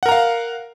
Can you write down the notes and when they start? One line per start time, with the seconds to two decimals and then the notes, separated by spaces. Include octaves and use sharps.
0.03 F#5
0.06 A#4
0.09 A#5
0.12 F5